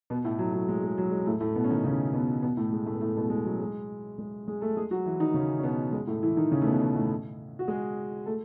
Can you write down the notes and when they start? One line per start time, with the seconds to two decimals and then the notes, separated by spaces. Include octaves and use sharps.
0.10 B2 B3
0.24 A2 A3
0.39 F#3
0.53 F#3
0.69 G#3
0.83 G#3
0.98 F#3
1.11 G#3
1.26 A2 A3
1.40 A2 A3
1.55 B2 B3
1.64 C#4
1.70 D#3 D#4
1.84 C#3 C#4
2.14 B2 B3
2.43 B2 B3
2.57 A2 A3
2.73 G#3
2.86 A2 A3
2.94 B3
3.01 A2 A3
3.17 B2 B3
3.30 G#3
3.45 F#3
3.60 G#3
4.18 G#3
4.47 G#3 G#4
4.61 A3 A4
4.77 G#3 G#4
4.91 F#3 F#4
5.06 E3 E4
5.20 D#3 D#4
5.34 C#3 C#4
5.59 C#4
5.63 B2 B3
5.92 G#3
6.07 A2 A3
6.23 E3 E4
6.37 D#3 D#4
6.51 C#3 C#4
6.61 A3
6.66 B2 B3
6.80 B2 B3
6.95 A2 A3
7.59 F#4
7.68 G#3 G#4
8.26 A3 A4